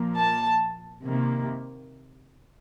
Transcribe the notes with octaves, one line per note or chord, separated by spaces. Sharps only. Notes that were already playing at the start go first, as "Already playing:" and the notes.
Already playing: A#2 F3 A#3
A5
C3 D#3 A#3